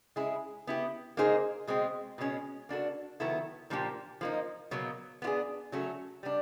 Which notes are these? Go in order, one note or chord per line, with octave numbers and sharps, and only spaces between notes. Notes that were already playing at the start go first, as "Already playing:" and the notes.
G#3 C#4 E4 G#4
B3 E4 G4
A#3 D#4 G#4 C5
B2 G#3 C4
B2 G#3 C#4
A#3 D4 F#4 A4
D#3 F#3 B3 E4 A4
A#2 F3 A#3 D4 G4
F3 A#3 D#4
B2 F#3 A#3
B3 D4 F4
G#4
F#3 A3 C#4 F#4 A4
G3 B3 D4